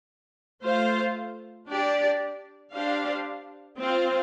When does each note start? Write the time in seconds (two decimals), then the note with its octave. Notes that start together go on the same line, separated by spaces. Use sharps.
0.62 A3 F4 C5 F5
1.67 D4 G4 D5
2.73 D4 G4 C5 F5
3.78 C4 F4 C5 F5